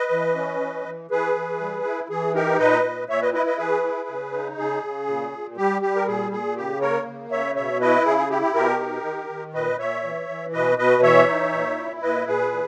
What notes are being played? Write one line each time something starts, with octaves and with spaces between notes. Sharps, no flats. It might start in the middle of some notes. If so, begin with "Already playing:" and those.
Already playing: B4 D#5
E3
C#4
E3
E3
E3 G#4 B4
E3
G3
E4
E3 G#4
D#4 G4 A#4
A#2 B4 D#5
A#2
A#2 C#5 E5
B4 D#5
E4 B4 D#5
B4 D#5
E3 G#4 B4
E4
C#3
D#4
C#3 G#4
C#3
A#2
A#2
G3 G4
G3 G4
A#4
A#2 G#4
A#2 G#4
C#3 G4
A#3 A#4 C#5
C#3
C#3 C#5 E5
B2 C#5 E5
E4 B4 D#5
C#3 G#4
G#4
E4 G4
G4
B2 G4 A#4
D#4
D#3
D#3
A#2 B4 D#5
A#2 C#5 E5
E3
E3
B2 B4 D#5
B2 B4 D#5
E3 C#5 E5
D#4
A#2
E4
A#2 B4 D#5
A#2 G#4 B4
E3